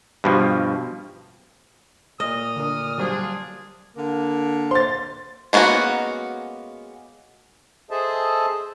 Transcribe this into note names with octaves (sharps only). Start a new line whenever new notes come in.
G2 B2 F3
A#2 D#5 D#6 F6
D3 A#4
F#3 G3 D4 F4 G#4 C5
D3 A#3
C5 C6 A6
G#3 A#3 B3 C#4 F#4
G#4 A4 C5 D#5 E5 A5